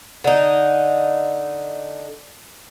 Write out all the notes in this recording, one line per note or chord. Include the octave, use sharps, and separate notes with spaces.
D3 D#4